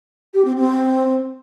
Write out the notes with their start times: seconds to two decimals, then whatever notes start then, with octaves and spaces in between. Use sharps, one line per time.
0.34 G4
0.45 C4
0.56 C4